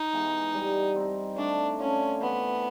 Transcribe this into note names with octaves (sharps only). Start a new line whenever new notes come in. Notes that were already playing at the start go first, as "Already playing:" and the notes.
Already playing: D#4
E3 G#3 B3
G3
C4 D#4
A3 D4
C#4 D4 F4
E3 B3